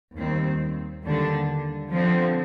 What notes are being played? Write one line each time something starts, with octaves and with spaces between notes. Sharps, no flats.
D#2 D#3 G3 C4
D#2 D3 G3 D4
D3 F3 C4